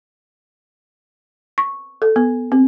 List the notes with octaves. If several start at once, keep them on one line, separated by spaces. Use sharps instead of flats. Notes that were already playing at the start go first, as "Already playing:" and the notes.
C#6
A4
B3
C4